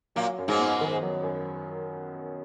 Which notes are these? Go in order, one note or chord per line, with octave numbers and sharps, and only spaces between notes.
A#2 F#3 A#3
F#2
G#2 G#3
B3
D#3
F#3
F#2